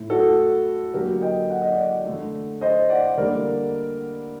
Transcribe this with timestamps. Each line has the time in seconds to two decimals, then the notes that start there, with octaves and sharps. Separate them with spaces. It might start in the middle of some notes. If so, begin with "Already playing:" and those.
Already playing: A2 A3
0.10 F#4 A4
0.94 D3 F#3 A#3 G4 A#4
1.22 D#5 G5
1.50 F#5
1.61 D#5
1.72 D5 F#5
2.06 D3 A3
2.61 C5 D#5
2.90 D5 F#5
3.17 D3 G3 A#3 A#4 D5